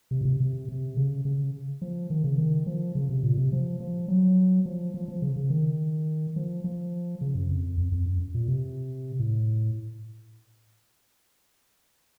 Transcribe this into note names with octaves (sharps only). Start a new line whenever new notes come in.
C3
A#2
C3
C3
C3
C#3
C#3
F3
D#3
C#3
D#3
F3
C#3
C3
A#2
C3
F3
F3
F#3
F3
F3
F3
C#3
C#3
D#3
F3
F3
C#3
F#2
F2
F2
F2
F#2
A#2
C3
A2